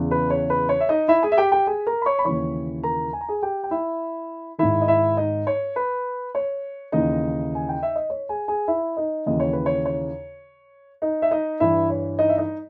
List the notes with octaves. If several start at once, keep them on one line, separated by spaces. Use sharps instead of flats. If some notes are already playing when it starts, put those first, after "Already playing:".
Already playing: E2 C#3 E3
B4
C#5
B4
C#5
E5
D#4 D#5
E4 E5
G#4 G#5
E5
G4 G5
G4 G5
G#4 G#5
A#4 A#5
B5
C#5 C#6
B5
D#2 C#3 E3 C#5 C#6
A#4 A#5
G#5
A#5
G#4 G#5
G4 G5
G5
E4 E5
G#2 D#3 E4 E5
D#5
E4 E5
D#4 D#5
C#5
B4
C#5
D#2 C#3 E3 D#4 D#5
G#5
G5
E5
D#5
C#5
G#4 G#5
G#4 G#5
E4 E5
D#4 D#5
D#2 C#3 E3 D#5
C#5
B4
C#5
C#5
D#4 D#5
E5
D#4 D#5
G2 E3 E4 E5
C#5
D#4 D#5
E5
D#4 D#5